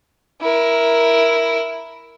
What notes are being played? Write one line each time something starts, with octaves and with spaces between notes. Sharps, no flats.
E4 A#4